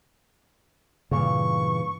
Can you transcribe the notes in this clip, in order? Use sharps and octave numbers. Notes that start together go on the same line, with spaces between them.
G2 A#2 C#3 E3 C#6